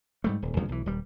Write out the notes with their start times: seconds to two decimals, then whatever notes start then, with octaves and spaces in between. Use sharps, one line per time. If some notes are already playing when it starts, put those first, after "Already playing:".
0.24 G#2 G3 A3
0.42 D#1
0.57 D2 G2 C#3 F3
0.69 B1 E3
0.86 D#1 G3